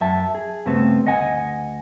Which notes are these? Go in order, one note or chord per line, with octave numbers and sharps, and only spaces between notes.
F#2 E5 A5
G#4
G2 C#3 A3 B3 C4
D2 D#5 F#5 G#5